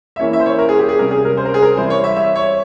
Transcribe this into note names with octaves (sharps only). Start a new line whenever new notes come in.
E5
E3 A#3 C#4 E4 C#5
E5
C5
C#5
A#4
G#4
G4
G#4
C3 G3 C#4 A#4
G#4
A#4
C5
A#4
G#4
A#4
E3 G3 C4 E4 C5
C#5
E5
E5
C#5